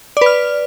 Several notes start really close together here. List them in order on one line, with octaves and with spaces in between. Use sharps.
D5 B4 F6